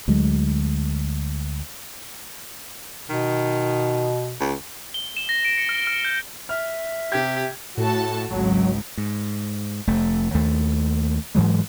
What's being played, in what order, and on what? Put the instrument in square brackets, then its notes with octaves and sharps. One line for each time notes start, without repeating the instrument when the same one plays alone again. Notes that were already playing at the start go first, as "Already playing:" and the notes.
[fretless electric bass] D2 F#3 G#3
[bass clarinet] B2 [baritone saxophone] D#3
[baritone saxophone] C#2
[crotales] G7
E7
A#6
D7
C#7
F6
F6
G6
[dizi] E5 [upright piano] F6
[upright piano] C3 G#6 [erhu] G4
[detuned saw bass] A2 [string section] F#4 A4 A5
[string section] G#1 C#2 [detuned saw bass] F#3
[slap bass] G#2
F1 A3
D#2 A3
G#2 E3 F#3 G#3